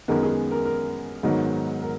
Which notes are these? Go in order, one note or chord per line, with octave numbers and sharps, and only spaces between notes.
F#2 D#3 G#3 B3 A#4
G#4
A#4
A#4
G#2 D#3 F#3 B3
A#4